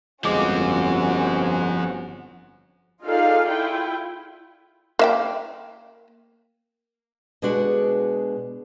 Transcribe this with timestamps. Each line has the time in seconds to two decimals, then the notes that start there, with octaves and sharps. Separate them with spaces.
0.24 G1 F3 G#3 C4 C#4 F#4 D6
3.04 D#4 F4 G#4 A4 D5 F5
3.49 E4 F4 G5
4.99 A#3 E5 G5
7.42 B2 G#3 D4 F#4 G#4